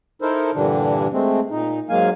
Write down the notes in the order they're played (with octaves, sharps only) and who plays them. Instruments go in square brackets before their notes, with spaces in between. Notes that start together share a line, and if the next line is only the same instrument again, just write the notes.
[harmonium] D#4 E4 A4 A#4 C5
G2 A#2 D3 E3 G3 D4
G#3 A3 C4
A#2 D#4
G#2 F#3 G#3 A#3 F5 G#5